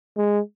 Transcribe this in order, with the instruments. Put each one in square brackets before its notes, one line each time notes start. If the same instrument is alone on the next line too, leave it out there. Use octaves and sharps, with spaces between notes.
[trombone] G#3